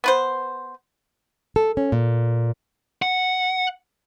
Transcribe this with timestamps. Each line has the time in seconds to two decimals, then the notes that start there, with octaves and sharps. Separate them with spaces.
0.04 B3 B4 C5
1.56 A4
1.77 C#4
1.92 A#2
3.02 F#5